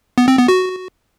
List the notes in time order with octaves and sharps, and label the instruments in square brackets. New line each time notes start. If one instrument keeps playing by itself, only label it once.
[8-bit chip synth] B3
C4
B3
F#4